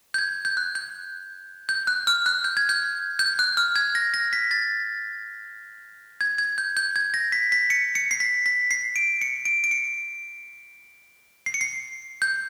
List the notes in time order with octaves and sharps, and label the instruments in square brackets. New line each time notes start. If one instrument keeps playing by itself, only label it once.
[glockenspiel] G6
G#6
G6
F#6
G6
G6
F#6
F6
F#6
G6
G#6
G6
G6
F#6
F6
G#6
A#6
A#6
B6
A6
G#6
G#6
G6
G6
G#6
A#6
B6
B6
C#7
C#7
C7
B6
B6
C7
D7
C#7
D7
D7
C#7
C7
C#7
C7
G6